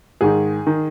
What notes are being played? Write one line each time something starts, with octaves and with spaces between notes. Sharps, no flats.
G#2 D#3 G#4
D#3